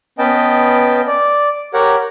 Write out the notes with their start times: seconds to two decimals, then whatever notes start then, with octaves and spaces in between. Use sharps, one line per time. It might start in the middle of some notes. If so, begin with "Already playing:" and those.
0.19 B3 C#4 B4 D#5 G5 A5
1.07 D5
1.74 G4 A#4 C#5 F#5